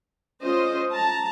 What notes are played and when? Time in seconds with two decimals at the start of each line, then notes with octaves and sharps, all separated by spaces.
0.42 C#4 F4 C5 D#5
0.92 A5 A#5